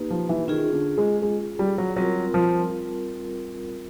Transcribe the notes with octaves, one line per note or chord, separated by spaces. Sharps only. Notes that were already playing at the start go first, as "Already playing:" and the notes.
Already playing: A#3 D#4 G4 B4
F3
E3
D#3 C#4 F4 G#4
D3
G#3
G#3
G3
F#3
F#3 G3 C4 F4 A#4
F3